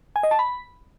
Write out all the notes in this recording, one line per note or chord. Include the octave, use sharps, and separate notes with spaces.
G#5
D#5
A5
B5